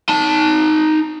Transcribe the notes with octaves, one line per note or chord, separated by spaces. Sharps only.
D#4 A5